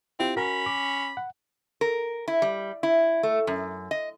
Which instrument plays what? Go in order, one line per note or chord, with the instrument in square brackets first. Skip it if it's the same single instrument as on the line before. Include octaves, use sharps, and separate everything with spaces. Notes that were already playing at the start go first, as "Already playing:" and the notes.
[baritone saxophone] C4 [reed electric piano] E4 F4 G4
[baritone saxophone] C#4 [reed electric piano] F#4 A#4 [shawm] B5
[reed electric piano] D6
F#5
[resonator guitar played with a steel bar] A#4
E4
G3
E4
A3
F#2
D#5